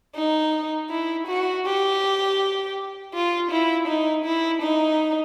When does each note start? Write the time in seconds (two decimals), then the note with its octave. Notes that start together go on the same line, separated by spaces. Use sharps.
0.16 D#4
0.90 E4
1.27 F#4
1.65 G4
3.14 F4
3.51 E4
3.88 D#4
4.25 E4
4.62 D#4